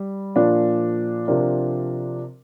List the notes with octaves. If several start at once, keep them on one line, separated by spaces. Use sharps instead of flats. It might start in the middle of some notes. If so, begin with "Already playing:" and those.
Already playing: G3
A#2 F3 D4
C3 F3 D4 A#4